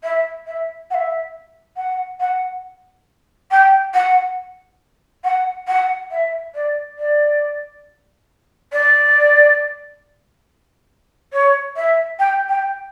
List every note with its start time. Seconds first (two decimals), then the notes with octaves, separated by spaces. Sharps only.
0.03 E5
0.47 E5
0.90 F#5
0.94 E5
1.77 F#5
2.20 F#5
3.51 G5
3.94 F#5
5.24 F#5
5.68 F#5
6.11 E5
6.55 D5
6.98 D5
8.72 D5
11.33 C#5
11.76 E5
12.19 G5
12.49 G5